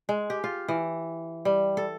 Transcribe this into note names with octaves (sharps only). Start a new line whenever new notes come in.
G#3
G4
F4
E3
G3
A4